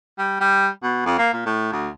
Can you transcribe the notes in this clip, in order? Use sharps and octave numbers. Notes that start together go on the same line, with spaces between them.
G3
G3
B2
F2
A#3
A#2
A2
D2